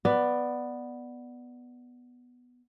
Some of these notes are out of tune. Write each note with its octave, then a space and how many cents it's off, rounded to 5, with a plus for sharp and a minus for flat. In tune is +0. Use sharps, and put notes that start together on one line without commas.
B3 +0 D5 +10